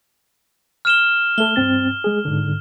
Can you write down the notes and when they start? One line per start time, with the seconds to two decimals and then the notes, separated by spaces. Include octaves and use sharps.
0.85 F6 E7 G7
1.38 A3 A4 G7
1.56 G2 C4 A6
2.04 G#3 G#4
2.25 G#2 D3